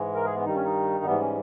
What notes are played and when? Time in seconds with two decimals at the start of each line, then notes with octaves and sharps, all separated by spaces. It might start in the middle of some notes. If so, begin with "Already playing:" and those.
Already playing: G#2 E3 G#3
0.15 A#4
0.25 G#4
0.35 B3
0.45 G2 D#3 G3 D#4
0.55 C#4
0.65 D#4
1.05 G#2 E3 G3 B3
1.20 C#4